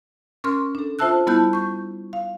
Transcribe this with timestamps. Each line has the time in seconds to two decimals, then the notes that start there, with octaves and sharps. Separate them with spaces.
0.44 C#4 A#4 C6 F6
0.75 D4 A4
0.99 F4 C5 E5 A5 E6 F#6
1.27 G3 B3 E4 A5 F#6 G6
1.53 C#6 G6
2.13 F5